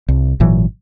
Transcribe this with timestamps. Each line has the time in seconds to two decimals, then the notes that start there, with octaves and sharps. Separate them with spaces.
0.08 C2
0.40 G#1 A#2 E3 F#3